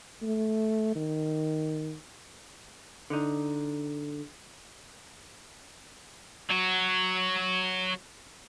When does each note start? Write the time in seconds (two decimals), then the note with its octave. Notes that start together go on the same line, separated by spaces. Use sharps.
0.22 A3
0.95 D#3
3.10 D3 D#4
6.51 F#3 F#4